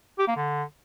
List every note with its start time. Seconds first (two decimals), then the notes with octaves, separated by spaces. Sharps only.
0.19 G4
0.28 A#3
0.36 D3